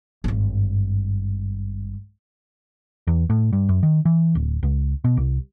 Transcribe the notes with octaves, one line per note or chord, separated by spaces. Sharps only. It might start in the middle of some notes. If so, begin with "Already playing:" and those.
G#1 G2
E2
A2
G2
F#2
D#3
E3
D1
C#2
B2
C2